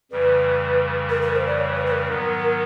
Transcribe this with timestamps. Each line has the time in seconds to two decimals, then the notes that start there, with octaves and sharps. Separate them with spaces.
0.11 F2 C#3 E3 G3 B4
1.10 A#4
1.22 A#4
1.34 C5
1.47 D5
1.59 C#5
1.75 B4
1.86 B4
1.91 A#4
2.08 G#2 D#3 F#3 B3